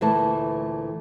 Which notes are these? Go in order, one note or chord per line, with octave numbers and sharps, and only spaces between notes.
D2 A#2 E3 A3 B4 A5